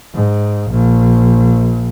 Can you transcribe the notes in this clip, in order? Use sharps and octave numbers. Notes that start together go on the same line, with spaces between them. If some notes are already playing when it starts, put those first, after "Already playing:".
G#2
A#1